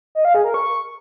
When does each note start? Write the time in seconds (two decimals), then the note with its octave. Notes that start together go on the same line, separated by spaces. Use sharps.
0.15 D#5
0.25 F5
0.35 G#4
0.44 A#4
0.54 C#6